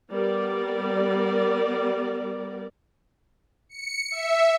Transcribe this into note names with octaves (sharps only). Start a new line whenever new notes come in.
G3 B3 A#4 D5
C#7
E5